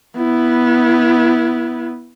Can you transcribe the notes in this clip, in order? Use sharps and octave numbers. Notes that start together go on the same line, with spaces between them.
B3 E4